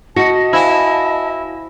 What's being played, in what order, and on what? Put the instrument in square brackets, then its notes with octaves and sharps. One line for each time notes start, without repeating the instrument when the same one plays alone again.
[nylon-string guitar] F#4 [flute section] D#5 A5 [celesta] A#6 C#7
[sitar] E4 [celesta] C5 F5 G#5